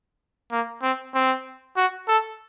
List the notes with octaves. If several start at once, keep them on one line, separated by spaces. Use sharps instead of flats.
A#3
C4
C4
F#4
A4